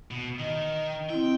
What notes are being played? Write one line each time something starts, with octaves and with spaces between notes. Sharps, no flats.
B2
D#3 D#5
C4 E4 G5